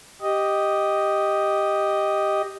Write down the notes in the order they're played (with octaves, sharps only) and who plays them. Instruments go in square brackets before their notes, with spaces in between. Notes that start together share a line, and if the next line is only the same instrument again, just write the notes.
[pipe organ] G4 D#5